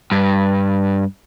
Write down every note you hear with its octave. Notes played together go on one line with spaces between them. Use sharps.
G2